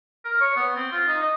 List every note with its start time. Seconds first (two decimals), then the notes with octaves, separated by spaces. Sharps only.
0.25 A#4
0.40 C#5
0.56 B3
0.76 C4
0.92 F4
1.07 D#4
1.23 D#5